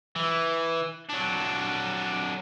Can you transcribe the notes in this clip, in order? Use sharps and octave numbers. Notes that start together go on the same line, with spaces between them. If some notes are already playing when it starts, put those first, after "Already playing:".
E3
F#3 D4